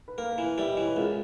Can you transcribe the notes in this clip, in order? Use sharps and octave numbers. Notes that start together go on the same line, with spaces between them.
B4
A#3 A#4
A#4
E3
B4
G3 E5
D#5
E3 C#5
B4
C#2 A#4